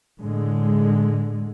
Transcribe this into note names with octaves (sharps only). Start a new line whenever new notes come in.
A2 D3 G#3